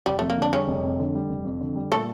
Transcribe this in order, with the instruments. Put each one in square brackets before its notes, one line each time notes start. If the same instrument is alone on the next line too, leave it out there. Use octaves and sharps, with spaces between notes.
[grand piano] F1 [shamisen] G3
[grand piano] F2 [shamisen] A3
[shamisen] A#3
[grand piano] D3 [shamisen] D4
[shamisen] C#3 C#4 [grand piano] G3
[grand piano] F1
F2
D3
G3
F1
F2
D3
G3
[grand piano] A#2 [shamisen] A3 A4